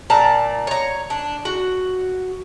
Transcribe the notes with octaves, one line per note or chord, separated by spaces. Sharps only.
A#2 D5 A5 A#5
C#5 A#5
D4
F#4